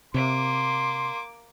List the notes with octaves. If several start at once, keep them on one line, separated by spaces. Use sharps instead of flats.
C3 A#3 C6 D6